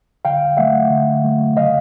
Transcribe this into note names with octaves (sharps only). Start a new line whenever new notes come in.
D3 F5 G5
F#3 A3 E5 F#5
D3
F#3 A3
C#3 D#5 F5